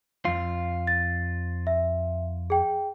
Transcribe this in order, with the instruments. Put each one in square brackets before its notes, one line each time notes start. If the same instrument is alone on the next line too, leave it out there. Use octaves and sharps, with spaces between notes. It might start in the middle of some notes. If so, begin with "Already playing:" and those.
[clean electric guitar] F2 F4
[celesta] A6
E5
G#4 G5